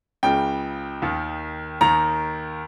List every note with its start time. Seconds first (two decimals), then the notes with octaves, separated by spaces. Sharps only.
0.23 C#2 C#3 G5
1.02 D#2 D#3
1.81 D#2 D#3 A#5